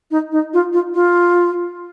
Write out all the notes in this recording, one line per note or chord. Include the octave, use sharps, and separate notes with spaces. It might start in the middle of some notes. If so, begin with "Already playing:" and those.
D#4
D#4
F4
F4
F4